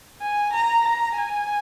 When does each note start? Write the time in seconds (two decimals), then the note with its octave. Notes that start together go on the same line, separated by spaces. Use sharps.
0.21 G#5
0.53 A#5
0.85 A#5
1.18 G#5